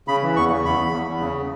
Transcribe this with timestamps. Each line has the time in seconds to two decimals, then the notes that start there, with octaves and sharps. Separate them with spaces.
0.08 C#3 B5
0.22 E3
0.36 E2 C#6
0.50 C#3
0.65 E2 B5
0.79 E2
0.92 E2
1.07 E2
1.20 C#3